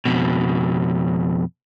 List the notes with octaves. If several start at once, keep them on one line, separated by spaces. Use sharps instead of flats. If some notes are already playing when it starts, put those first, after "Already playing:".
F2 B2